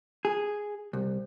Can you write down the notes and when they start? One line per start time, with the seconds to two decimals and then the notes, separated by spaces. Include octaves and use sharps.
0.25 G#4
0.93 C2